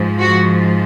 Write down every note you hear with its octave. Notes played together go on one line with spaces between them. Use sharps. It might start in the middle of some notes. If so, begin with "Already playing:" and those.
Already playing: G#2 F3
F#4